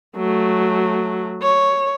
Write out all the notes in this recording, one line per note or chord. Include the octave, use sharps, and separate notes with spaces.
F#3 A3
C#5